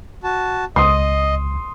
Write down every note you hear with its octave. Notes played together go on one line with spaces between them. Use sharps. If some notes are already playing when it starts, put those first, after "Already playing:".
F#4 A5
C#2 D#5 C6 D#6